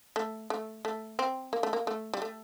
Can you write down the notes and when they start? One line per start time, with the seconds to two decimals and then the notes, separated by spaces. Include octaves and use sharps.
0.16 A3
0.50 A3
0.85 A3
1.19 C4
1.53 A#3
1.63 A3
1.73 A#3
1.87 A3
2.14 G3
2.22 A3